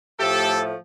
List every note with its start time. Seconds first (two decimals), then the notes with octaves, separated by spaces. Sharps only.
0.17 A2 F3 A3 G4 A4